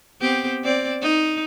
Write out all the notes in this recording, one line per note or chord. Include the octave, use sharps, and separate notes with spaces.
B3 C4 G4
C4 D5
D#4